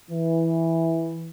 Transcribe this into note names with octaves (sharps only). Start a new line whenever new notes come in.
E3